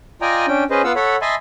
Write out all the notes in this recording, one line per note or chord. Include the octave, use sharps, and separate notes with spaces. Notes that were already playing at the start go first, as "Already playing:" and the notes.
F4 D5 D#5 G5 G#5 A#5
C#4 D4 G5
C#4 G#4 B4 C5 D#5
B3 F4 F5 F#5 E6
A4 C#5 F#5 B5
D#5 E5 G#5 A5 B5 C6